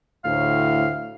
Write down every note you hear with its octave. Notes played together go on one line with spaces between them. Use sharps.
D2 A2 F5